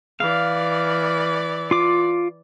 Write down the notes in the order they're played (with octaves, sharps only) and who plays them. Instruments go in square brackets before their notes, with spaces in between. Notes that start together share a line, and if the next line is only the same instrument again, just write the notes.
[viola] E3 D5 [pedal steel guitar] F5
[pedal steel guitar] F4 D6